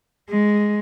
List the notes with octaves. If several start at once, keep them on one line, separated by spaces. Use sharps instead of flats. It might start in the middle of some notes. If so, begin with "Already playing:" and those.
G#3